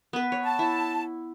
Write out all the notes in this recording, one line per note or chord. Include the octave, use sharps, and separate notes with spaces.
B3 B4
C#5
A5
E4